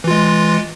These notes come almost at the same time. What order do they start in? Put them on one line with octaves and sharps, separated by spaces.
E3 F4 G#3